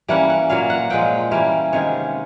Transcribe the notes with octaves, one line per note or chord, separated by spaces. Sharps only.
E3 G3 A#3 C#4 F#5
F#5
A#2 F#3 A#3 F5
F#5
A#2 F3 G#3 G5
E3 G3 A#3 C#4
C3 D#3 G#3 C#4 C#5